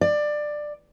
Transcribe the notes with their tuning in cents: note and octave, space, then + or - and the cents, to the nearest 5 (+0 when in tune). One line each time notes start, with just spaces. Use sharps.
D5 +15